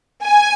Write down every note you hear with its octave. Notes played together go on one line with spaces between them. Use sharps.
G#5